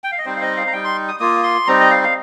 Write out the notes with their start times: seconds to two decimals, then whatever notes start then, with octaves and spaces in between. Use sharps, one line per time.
0.04 G5
0.12 F5
0.18 D#5
0.25 G3 C4 D#4 C5
0.36 F5
0.42 D#5
0.57 F5
0.67 A#5
0.73 G3 D#4 G5
0.84 C6
1.08 D#6
1.20 A#3 F4 D#6
1.43 C6
1.67 G3 C4 D#4 A#5
1.80 D#5
1.91 F5
2.04 F5